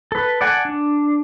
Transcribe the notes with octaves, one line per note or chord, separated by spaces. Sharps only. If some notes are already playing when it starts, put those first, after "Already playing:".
A4 B4
D5 F#5 G#5 A5
D4